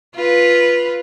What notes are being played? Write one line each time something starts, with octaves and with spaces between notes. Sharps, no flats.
F4 B4